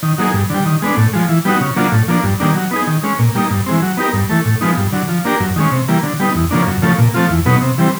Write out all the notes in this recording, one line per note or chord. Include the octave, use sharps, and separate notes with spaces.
D#3
F#3 A#3 D#4 G#4
G2
D3 G3
D#3
G#3 B3 D4
A2
F3 G#3
E3
G3 B3 D#4 F#4
C#3
F#3 A#3 D4 F4
A2
F3 A#3 D4
G2
D#3 G3 A#3 D4
F#3
B3 D#4 G#4
D#3
G#3 C#4
A#2
G3 A#3 D#4
G2
E3 G#3 C4
F#3
B3 D#4 G4 A#4
G2
E3 A3
A2
F3 G#3 B3 D#4
G2
D3 F#3
F3
A#3 D4 G4 A#4
F#2
D#3 G#3 C#4
C3
E3 G3 A#3
D3
G3 B3 D#4
E2
C#3 F3 A#3 D4
F#2
C#3 F3 A3
A#2
F3 A3 C4 F4
E2
B2 F#3 B3 D#4
C3
E3 G3 C4